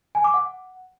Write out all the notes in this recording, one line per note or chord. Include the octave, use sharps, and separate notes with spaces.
G#5
D6
F#5